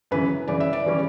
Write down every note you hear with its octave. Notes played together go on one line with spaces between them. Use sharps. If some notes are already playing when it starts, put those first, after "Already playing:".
F#2 C#3 E3 B4
F#2 C#3 E3 D5
E5
D5
E3 G3 C#4